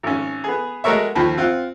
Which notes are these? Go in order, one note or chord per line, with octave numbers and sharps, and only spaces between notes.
G#1 C#4
B3 G#4
G#3 F#4 A4 A#4 C#5 E5
D#2 F3 B5
C4 F4 F#5